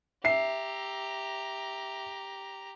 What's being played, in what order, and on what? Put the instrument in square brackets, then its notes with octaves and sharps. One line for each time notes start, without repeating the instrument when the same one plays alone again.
[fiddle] G4 A#5 [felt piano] E5 C7